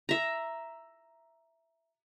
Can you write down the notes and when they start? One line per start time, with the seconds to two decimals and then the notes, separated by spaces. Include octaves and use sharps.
0.09 E5 A#5